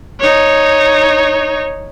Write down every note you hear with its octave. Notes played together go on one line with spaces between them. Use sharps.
D#4 C#5